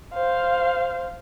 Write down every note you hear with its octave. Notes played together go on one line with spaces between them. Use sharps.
C5 F5